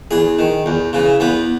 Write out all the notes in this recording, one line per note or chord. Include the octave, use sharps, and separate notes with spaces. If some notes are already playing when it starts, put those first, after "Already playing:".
E2 G#4
D#3
E2
C#3 E3
E2 B3